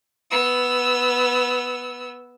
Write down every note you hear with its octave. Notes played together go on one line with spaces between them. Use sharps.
B3 E6